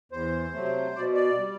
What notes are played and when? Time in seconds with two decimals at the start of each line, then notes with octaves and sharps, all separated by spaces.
0.12 E2 C5
0.54 C3 F#3 A3
0.96 B2 D5
1.14 D5
1.39 G3